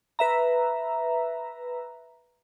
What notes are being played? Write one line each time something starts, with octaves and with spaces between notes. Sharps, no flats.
B4 E5 A#5